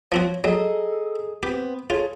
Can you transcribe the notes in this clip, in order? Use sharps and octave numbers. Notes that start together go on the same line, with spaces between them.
F3 C4 F#4 C#5
F#3 G#4 A4 D#5 A#5
B3 C4 G4
F4 G#4 A4 C#5